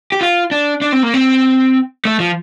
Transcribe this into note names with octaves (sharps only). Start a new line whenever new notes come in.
G4
F4
D4
D4
C4
A#3
C4
A3
F3